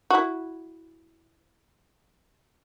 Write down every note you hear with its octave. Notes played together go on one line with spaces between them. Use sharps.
E4 F#4